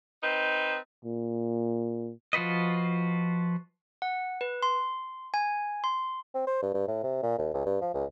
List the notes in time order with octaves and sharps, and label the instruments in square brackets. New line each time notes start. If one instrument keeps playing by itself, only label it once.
[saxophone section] C4 D#4 B4
[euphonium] A#2
[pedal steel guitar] F3 F4 F#4 B4 D#5
[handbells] F#5
B4
C6
G#5
C6
[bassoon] C4
C5
G2
G2
A2
C3
A#2
D#2
C#2
G2
F3
C#2